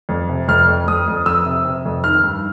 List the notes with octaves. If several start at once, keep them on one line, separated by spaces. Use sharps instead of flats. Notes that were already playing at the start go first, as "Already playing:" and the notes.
F2
C3
F2 F6
F2
F2 D#6
F2
F2 E6
C3
C3
F2
D#3 F6
G2